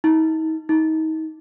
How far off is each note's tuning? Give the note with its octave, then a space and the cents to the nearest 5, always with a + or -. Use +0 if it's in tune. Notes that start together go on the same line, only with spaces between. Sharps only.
D#4 +40
D#4 +30